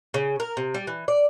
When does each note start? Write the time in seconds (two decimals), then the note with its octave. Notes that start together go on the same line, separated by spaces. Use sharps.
0.14 C#3
0.40 A#4
0.57 C3
0.74 G3
0.87 E3
1.08 D5